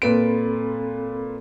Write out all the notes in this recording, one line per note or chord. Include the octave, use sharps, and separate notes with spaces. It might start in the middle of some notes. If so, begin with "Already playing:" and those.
A#2 C4 A4 B4 B5 D7